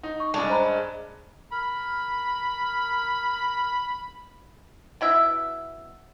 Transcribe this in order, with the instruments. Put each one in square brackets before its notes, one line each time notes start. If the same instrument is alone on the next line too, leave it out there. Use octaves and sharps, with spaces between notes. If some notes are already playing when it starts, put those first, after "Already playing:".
[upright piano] D#4
[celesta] C#6
[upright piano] G2 D5 A5 [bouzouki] G#3
[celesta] C5 A#5 B5
[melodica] A#4 [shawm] B5
[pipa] B2 E4 E5